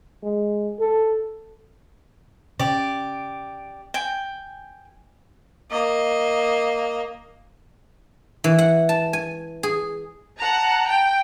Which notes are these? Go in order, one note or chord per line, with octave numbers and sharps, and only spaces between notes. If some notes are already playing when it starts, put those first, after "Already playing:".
G#3
A4
C#3 G4 D5
G5 G#5
A#3 D#5
E3
F#5
A5
G#5
G#4
F#5 A5 A#5
G5